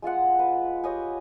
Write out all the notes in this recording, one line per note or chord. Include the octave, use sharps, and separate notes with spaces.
G#3 F4 F5 F#5
B4
G4 C#5 D#5 G#5